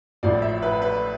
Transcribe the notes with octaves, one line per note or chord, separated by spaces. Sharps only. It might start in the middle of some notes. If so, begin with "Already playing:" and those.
A1 A2 F3 D5
E5
B4
B4